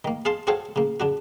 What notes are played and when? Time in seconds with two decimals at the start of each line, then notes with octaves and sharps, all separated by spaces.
0.05 D#3 A#3
0.25 G#4 F5 A5 C6
0.47 C4 F#4 G#4 A4 C#5 F5
0.76 C#3 A#3
1.00 C#3 D4 F#4